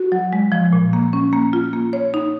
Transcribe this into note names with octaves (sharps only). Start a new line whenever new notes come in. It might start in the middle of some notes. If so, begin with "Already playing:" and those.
Already playing: F#4
F#3
G#3
F3
A#2
A#3
C#4
A#3
F4
A#3
C#5
D#4